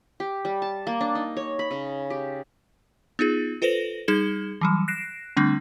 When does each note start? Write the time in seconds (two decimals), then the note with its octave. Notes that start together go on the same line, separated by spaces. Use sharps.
0.20 G4
0.45 G3
0.62 A5
0.87 A#3
1.01 D4
1.15 D#4
1.37 C#5
1.59 B5
1.71 C#3
2.10 G4
3.19 B3 D#4 F4 G#4
3.62 F4 A4 B4 C5 A#6 F#7
4.08 G3 D#4 G#4 G#6 E7 G7
4.61 E3 F#3 G3
4.88 F#6 A#6 C7 D7 E7
5.37 D3 G3 A3 C4 D4